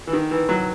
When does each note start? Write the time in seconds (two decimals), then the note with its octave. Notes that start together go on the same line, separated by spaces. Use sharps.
0.07 E3
0.13 D#3
0.31 E3
0.49 F#3